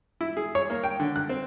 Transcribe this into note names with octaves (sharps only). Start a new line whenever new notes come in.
E4
G#4
C#5
A#3
G5
D3
F#6
C4